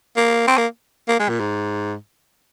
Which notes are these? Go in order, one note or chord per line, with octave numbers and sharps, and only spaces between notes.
A#3
C4
A#3
A#3
G#3
A#2
G#2